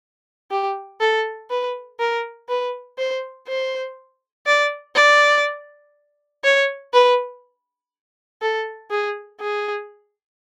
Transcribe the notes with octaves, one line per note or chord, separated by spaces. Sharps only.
G4
A4
B4
A#4
B4
C5
C5
D5
D5
C#5
B4
A4
G#4
G#4